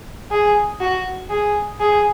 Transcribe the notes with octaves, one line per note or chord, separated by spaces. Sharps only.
G#4
F#4
G#4
G#4